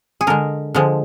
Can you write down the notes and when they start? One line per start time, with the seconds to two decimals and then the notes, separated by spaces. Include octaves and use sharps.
0.21 G#4
0.27 D3 G#3 A#4
0.74 D3 F3 G#3